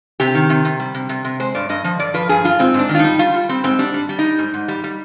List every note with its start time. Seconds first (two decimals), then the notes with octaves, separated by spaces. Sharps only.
0.20 C3 G4
0.35 D#3
0.50 C3
0.65 C3
0.80 G3
0.94 C3
1.09 C3
1.25 C3
1.40 G#3 C5
1.55 G2 D5
1.69 G2 D#5
1.84 F3 D#5
1.99 G2 D5
2.14 F3 B4
2.29 G2 G#4
2.44 G2 F4
2.59 G#2 C4
2.74 G#2 D4
2.89 D#3
2.94 F4
2.99 G3 D#4
3.19 G3 F4
3.34 G3
3.49 G3 C4
3.64 G#2 C4
3.79 G3 D4
3.94 G3
4.09 G3
4.19 D#4
4.24 G3
4.39 G#2
4.54 G#2
4.68 G3
4.84 G3